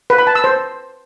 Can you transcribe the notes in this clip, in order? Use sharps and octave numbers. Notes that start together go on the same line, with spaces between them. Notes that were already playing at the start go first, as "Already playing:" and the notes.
B4
B5
A5
E6
C5